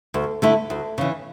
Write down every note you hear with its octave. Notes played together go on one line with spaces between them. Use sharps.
D2
D3 A3 E4
D2
C#3 E3